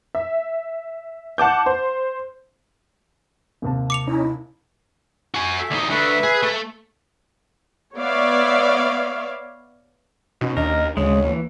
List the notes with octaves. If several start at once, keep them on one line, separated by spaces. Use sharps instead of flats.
E5
F#5 A5 D6 G6
C5
D#2 C3 A5
D6 C#7 F7
C#4 D#4 E4
F#4 G#5
A3 E5
D2 D#4
D3 A3 B4 E5
G#4
A3
B3 C#5 D5 E5 F5
B2 C#4 D#4 F#4
D#2 D4 A#4 D#5
D2 C#3 G#3 C#5
E3 A#3